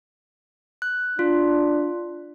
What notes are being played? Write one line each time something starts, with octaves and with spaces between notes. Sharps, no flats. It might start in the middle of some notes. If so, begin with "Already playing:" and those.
F#6
D4 F4